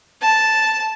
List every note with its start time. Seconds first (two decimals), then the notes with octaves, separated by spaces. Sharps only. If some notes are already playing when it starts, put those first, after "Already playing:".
0.22 A5